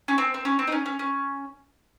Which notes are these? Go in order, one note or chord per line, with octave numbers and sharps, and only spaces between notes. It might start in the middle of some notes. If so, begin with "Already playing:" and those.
C#4
C4
C4
C#4
C4
D#4
C#4
C#4
C#4